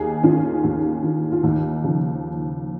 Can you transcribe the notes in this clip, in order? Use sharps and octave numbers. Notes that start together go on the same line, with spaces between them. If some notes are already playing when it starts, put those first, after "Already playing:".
Already playing: D#2 D#4 G#4
D#3 C#4 F4
D#2
D#3
F4
D#2 D#4
C#3 F3